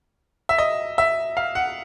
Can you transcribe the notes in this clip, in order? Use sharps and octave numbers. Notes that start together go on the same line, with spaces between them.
E5
D#5
E5
F5
F#5